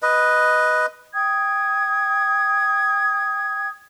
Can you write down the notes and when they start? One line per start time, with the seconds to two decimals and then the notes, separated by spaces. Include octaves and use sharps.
0.02 B4 D#5
1.14 G5 D#6 G#6